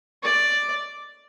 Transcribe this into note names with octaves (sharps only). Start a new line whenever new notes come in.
D5